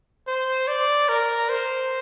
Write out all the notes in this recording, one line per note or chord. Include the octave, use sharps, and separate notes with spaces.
C5
D5
A#4
C5